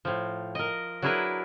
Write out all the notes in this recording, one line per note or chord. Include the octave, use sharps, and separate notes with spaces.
A2 F3
A#4 D#5
F#3 D4 E4 G#4 A#4 B4